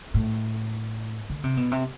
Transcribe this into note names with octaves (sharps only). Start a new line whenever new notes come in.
A2
D3
C3
B2
C3